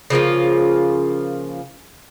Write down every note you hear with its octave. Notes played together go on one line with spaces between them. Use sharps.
C#3 F3 A#3 F4